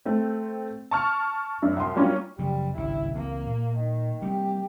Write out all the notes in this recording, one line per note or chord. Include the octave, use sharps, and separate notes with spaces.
A3 C4
A5 C#6 F6
F#2 D4
C2 C6
F#3 G3 A#3 C#4 D4 F4
F#2 C#3 F3 G3
G#1 C#2 G2 E4
C#2 E3 A#3 C4
A#2
D#3
G3 A#3 C4 G4